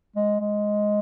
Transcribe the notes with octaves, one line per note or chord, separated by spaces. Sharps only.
G#3
G#3